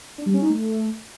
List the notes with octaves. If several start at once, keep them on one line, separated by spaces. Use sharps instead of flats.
D4
G3
C#4
D#4
A3